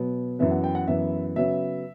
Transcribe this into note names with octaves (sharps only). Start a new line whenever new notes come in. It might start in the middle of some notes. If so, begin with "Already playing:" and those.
Already playing: B2 F#3 B3
F#2 E3 B3 E5
F#5
G5
F#5
F#2 E3 B3 E5
C#3 F#3 B3 E5